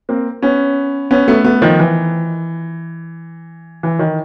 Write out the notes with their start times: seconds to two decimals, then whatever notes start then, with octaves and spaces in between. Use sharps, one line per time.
0.09 A#3 C4
0.42 B3 C#4
1.11 B3 C#4
1.28 A3 B3
1.44 A3 B3
1.62 D#3 F3
1.79 E3
3.83 E3
3.99 D#3